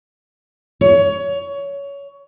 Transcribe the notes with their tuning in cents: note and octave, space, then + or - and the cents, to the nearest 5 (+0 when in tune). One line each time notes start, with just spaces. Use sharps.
C#5 +20